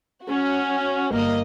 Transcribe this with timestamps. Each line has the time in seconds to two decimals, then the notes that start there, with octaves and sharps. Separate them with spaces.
0.25 C#4 F#4
1.13 G1 A#3 D#5